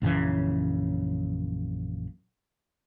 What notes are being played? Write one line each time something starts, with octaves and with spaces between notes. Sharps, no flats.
A#1 F#2 C#3 E3